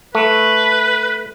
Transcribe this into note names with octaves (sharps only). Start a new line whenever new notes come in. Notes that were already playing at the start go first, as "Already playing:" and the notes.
A3 B4